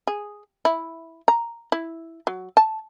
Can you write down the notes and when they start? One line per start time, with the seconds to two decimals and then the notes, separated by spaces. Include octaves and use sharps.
0.07 G#4
0.65 E4
1.28 A#5
1.72 E4
2.27 F#3
2.57 A5